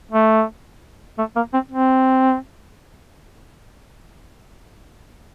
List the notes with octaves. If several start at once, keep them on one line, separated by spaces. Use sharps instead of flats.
A3
A3
A#3
C4
C4